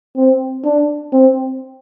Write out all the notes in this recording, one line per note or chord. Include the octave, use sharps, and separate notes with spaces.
C4
D4
C4